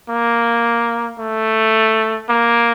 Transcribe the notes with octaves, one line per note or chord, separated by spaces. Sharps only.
A#3
A3
A#3